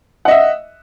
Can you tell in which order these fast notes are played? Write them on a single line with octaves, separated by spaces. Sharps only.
F#5 D#5 E5